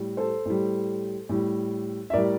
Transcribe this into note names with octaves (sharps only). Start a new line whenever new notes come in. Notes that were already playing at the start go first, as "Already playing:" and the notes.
Already playing: A2 G3
A4 C5
A2 G3
A2 G3
E5
A2 G3 A#4 D5